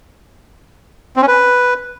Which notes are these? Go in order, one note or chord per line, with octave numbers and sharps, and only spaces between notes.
C4
C#4
B4